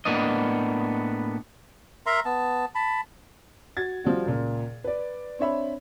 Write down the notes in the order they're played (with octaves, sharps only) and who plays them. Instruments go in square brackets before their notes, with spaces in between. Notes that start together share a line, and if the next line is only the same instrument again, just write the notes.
[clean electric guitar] A2 A#3 B3 D4 D#5
[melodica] A#4 E5 A#5 C6
B3 A5
A5 B5
[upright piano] F#4 G#6 A6
F3 G3 F#4
C#2 A#2
B4 D5
C4 D4 C#5 E5 B5